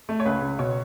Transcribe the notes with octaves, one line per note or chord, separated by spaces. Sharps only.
A3
C#5
C#2 B4
C#2
B2 C#5